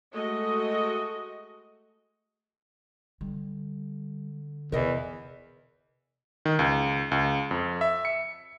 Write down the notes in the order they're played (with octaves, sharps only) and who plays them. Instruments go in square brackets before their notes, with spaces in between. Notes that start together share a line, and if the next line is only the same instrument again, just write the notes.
[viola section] G#3 A3 F#4 D#5
[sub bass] D3 [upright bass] G3
[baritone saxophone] E2 [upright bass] C3 [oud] A#4 D#5
[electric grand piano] D#3
C#2
C#2
F2
E5
C#7